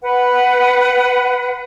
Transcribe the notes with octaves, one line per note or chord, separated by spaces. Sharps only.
B4 F#5